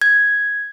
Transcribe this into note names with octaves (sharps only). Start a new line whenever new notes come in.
G#6